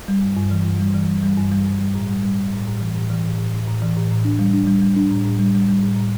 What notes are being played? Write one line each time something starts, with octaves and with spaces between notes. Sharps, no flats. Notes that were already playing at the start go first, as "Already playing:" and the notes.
G3
G2
G2
E3
G2
G3
E3
G3
G3
G2
G3
G2
G3
A2
G3
G3
G3
A2
A2
E3
A2
E3
A2
A2
A2
A2
E3
A2
A2
D4
G3
D4
G3
G3
D4
A2
A2
G3
G3
G3
A2
A2